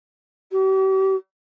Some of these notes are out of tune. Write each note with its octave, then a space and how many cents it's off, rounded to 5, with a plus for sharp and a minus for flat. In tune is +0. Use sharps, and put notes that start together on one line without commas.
G4 -40